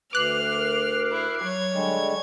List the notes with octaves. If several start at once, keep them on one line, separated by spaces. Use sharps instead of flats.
D2 B4 D6 F6 F#6 C7
A#4
E4
F#3 C#5 G#6
D3 G3 G#3